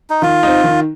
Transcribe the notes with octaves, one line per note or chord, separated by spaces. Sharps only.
D#4
D#3 F4
C4 D#4
D#3